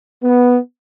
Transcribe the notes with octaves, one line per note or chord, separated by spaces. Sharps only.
B3